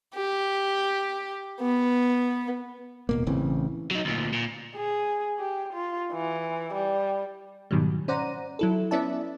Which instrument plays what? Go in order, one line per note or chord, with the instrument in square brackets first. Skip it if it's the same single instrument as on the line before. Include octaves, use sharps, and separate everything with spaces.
[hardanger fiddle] G4
B3
[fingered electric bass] D#1 B2 A#3
A1 C#3 E3 C4
[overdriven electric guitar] F#3 D#4
D2 A#2
A#2
[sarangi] G#4
G4
F4
E3
G3
[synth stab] G#2 B2 D#3 F#3 G3
C#4 C5 D5 F#5 A#5 D#7
F#3 E4 A4
B3 C#4 E4 D5 E5 A5